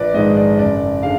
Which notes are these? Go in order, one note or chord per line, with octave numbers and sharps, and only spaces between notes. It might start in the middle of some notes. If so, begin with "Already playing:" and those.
Already playing: A#1 B4 D5
G#2 D#3 G#3 D#5
D5
F#1 D5
D3 G#3 F5